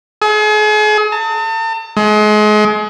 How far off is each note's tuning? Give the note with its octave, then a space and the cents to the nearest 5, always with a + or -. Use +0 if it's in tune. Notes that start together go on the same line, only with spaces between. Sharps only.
G#4 +40
A5 +40
G#3 +35